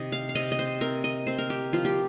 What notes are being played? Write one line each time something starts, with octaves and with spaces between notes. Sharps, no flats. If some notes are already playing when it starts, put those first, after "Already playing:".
Already playing: C3 D#3 D#5
F5
F5
C3 D#5
D#5
C5
C4 A#4
D#5
C4 C5
A#4
G4
F3 F4
G4